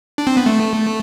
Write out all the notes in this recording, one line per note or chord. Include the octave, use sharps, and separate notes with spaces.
D4
C4
B3
A3